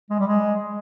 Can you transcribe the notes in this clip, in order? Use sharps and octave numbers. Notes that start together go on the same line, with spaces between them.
G#3
G3
G#3